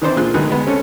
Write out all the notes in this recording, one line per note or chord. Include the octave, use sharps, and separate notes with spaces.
D#3 E3 C4 D4 C5 D5
A#2 D3 F4 G#4 C6 F#6
D2 D#3 F#3 G#3 B3 F#6
G#3 B3
C4 C#4 A4 C#5